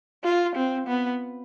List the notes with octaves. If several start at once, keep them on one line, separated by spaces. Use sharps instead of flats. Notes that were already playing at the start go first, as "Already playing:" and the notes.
F4
C4
B3